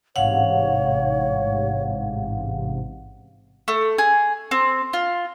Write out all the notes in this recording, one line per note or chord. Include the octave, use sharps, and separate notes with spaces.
A1 G#2 C3 C#5 F5 F#5
A3
G#4
C4
F4